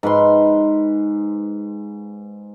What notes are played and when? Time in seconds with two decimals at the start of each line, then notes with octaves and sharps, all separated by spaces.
0.03 G#2 B4 B5 C6